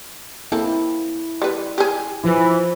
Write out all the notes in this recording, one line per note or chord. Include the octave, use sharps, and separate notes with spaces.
A#3 C4 E4 A4
G3 B4
G4 G#4
E3 F3 E4